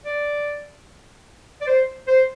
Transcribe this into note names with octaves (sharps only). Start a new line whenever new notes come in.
D5
D5
C5
C5